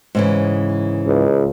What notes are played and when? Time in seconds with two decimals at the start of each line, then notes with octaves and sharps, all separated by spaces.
0.15 G#2 C#3 E3
1.07 C#2